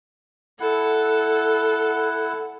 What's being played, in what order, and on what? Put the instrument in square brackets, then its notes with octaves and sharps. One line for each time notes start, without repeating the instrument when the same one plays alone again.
[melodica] E4 F#5 [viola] A4